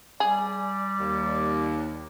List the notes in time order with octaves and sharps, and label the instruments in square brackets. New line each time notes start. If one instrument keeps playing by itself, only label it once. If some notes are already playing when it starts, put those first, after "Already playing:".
[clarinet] G3 [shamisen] G#4 [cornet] D5
[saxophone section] D#2